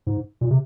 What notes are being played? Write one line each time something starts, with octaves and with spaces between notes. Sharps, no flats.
G#2
A#2
C3